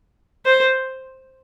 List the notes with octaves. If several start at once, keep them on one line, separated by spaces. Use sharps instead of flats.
C5